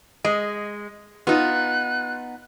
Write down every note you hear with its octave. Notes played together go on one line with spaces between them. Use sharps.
G#3 D#5
B3 D#4 F4 F#6